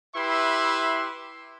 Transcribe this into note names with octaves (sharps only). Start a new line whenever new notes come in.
E4 G4 B4 E5 C6